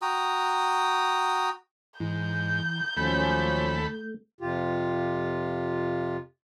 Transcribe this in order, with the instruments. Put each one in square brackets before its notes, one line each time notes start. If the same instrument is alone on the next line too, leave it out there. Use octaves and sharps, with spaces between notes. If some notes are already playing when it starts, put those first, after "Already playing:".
[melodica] F#4 G5 A#5 D#6
[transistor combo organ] G#2 [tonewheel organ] E3 [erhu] G6
[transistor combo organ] D#2 A4 B5 [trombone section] F3 F#3 C#4 [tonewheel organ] A3
[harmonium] F2 C3 F4 G4